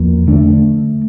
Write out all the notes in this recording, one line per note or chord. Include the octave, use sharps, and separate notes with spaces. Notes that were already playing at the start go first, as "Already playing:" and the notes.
Already playing: E2 F3 A#3
D3 A3 D4